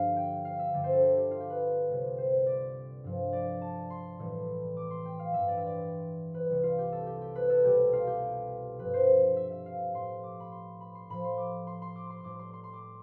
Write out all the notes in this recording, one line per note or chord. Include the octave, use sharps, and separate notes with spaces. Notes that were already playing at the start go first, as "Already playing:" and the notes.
Already playing: G2 D3 F3 G4 F5
G5
F5
E5
G2 D3 G3 D5
C5
A4
G4
G4
F4
G4
B4
C2 C3 G3
C5
D5
G2 F3
D5
A5
C6
A2 E3 G3
D6
C6
G5
F5
G2 E3 G3 E5
D5
E5
D5
B4
C2 C3 G3
F4
G4
A4
G4
G4
B4
A4
C2 B2 G3 G4
F4
G4
G2 F3 B4
C5
E5
E5
F5
A2 F3 C6
D6
B5
C6
B5
C6
A2 F3 B5
C6
D6
C6
C6
D6
C6
A2 G3 D6
C6
C6
C6
D6
C6